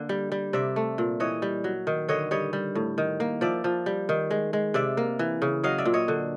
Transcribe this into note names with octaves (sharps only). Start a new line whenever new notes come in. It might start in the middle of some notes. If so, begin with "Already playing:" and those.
Already playing: D3 A#3
G3
G3
C3 D5 E5
A3
A#2
E3 C#5 D#5
G3
F#3
D#3
D3 C#5 D#5
G3 C#5 D#5
G3
A2
D#3
A#3
F3 D5 E5
F3
G3
D#3
G#3
G#3
C3 D5 E5
A#3
E3
C#3
F#3 D#5 F5
D5 E5
A#2
C#5 D#5
D3